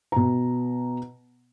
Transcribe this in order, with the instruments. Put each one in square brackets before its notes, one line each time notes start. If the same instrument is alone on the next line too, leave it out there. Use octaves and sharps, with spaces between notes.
[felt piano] B2 A#5